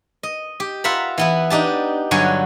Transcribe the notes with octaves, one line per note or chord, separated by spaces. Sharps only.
D#5
G4
F4 E5 F#5 A#5 B5
E3 B3 E4
D4 D#4 G4 A5
G2 D3 F#3 C#5 G#5